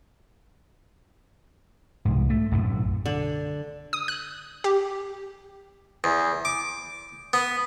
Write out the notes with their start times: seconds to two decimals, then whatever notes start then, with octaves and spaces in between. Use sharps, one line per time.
2.05 C2 G#2
2.30 A3
2.52 B1 F#2 A2
3.06 D3
3.93 D#6
4.08 F#6
4.64 G4
6.04 E2
6.45 D6
7.33 B3